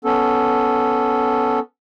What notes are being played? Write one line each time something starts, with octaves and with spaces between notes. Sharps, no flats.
B3 C#4 A4